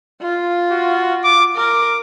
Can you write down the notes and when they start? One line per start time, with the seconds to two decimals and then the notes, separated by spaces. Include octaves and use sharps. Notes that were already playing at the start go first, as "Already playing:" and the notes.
0.21 F4
0.71 F#4
1.24 D6
1.56 A#4 D6